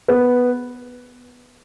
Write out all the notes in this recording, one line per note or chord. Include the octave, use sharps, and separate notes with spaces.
B3